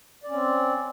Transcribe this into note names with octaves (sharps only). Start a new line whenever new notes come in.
C4 C#4 D5